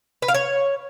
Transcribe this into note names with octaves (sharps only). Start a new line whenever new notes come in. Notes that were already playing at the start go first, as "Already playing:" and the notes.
B4
F5
C#5